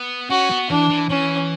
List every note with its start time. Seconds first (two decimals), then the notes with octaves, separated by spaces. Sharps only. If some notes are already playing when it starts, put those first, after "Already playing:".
Already playing: B3
0.30 C#4 F#4
0.50 B3
0.70 E3 D4
0.90 E3
1.10 E3 C#4